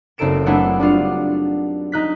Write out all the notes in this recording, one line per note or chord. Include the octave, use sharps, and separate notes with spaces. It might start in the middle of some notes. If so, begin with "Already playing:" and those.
F#1 C4 D#4 A4 D7 E7
F#3 A3 B3 C4 D4 E4
G3 D4 F4 F#4
D#4 F#6 B6